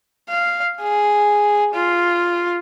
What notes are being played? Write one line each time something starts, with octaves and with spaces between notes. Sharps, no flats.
F5
G#4
F4